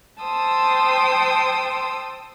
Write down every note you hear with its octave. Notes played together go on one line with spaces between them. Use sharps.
C5 G5 A5 D#6 E6